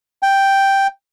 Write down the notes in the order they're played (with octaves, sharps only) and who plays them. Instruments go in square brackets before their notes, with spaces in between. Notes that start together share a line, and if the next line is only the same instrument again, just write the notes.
[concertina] G5